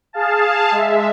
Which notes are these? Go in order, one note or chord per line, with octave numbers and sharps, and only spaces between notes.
G#4 F5 A5
G#3 E5